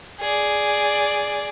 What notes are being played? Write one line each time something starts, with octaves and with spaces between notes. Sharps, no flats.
G#4 D5